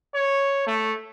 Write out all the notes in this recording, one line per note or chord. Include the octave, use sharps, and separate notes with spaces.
C#5
A3